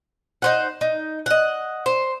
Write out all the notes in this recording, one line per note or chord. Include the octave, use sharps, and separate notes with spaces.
D#4 C5 F#5
D#4
D#5 F#5
C5